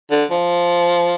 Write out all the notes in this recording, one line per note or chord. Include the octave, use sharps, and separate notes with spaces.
D3
F3